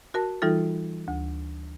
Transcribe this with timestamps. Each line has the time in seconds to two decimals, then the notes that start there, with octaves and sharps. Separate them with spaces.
0.14 F#4 A#4 A5
0.42 E3 G3 D#4 F4 A4
1.08 D2